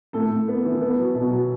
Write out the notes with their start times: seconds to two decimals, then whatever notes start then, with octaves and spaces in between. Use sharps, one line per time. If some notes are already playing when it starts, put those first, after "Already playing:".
0.13 A2 A4
0.30 A2
0.48 B3
0.65 E3
0.81 B3
0.98 F#3
1.15 B2
1.32 F#3